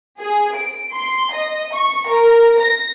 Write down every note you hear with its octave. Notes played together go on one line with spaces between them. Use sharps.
G#4
D7
C6
D#5
C#6
A#4
A#6